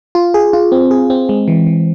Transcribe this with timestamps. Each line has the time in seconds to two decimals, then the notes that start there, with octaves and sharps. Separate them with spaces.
0.15 F4
0.34 G#4
0.53 F4
0.72 C4
0.91 G#4
1.10 C4
1.29 G#3
1.48 E3
1.67 E3